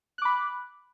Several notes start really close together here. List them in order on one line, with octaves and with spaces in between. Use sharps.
F#6 D6 B5